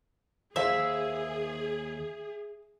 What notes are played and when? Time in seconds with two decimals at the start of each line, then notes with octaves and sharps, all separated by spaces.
0.56 D#2 G#4 C5 E5 F5 B5